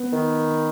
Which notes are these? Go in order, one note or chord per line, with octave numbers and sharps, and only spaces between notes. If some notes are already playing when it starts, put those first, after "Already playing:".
Already playing: B3
D#3